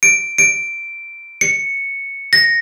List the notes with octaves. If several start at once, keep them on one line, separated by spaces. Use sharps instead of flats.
D7
D7
C#7
A#6